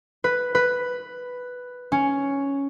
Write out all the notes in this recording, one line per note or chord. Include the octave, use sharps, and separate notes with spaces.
B4
B4
C#4